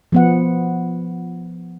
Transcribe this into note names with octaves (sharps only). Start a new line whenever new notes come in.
F3 B3 F#5